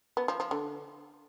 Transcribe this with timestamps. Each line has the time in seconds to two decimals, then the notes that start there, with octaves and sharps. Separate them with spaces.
0.17 B3
0.28 F3
0.40 F3
0.51 D3